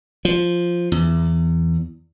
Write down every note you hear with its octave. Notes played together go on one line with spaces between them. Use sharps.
F3
E2